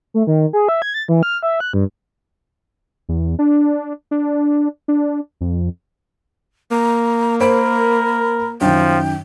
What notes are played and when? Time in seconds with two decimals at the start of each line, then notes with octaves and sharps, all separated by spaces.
0.14 A3
0.27 D#3
0.53 G#4
0.69 E5
0.82 G#6
0.94 A6
1.08 E3
1.23 F6
1.43 E5
1.60 F#6
1.73 G2
3.09 E2
3.39 D4
4.11 D4
4.88 D4
5.41 F2
6.71 A#3 A#5
7.40 A#4 C5 B5 D7
8.61 F#2 D#3 F3 G5